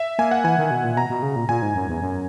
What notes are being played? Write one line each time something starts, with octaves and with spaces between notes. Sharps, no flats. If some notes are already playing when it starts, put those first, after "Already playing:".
Already playing: E5
A#3 G#5
F#5
E3 G#5
D#3
B2
A#2
B2 A#5
B2
C#3
A#2
A#2 G#5
G#2
F#2
E2
F#2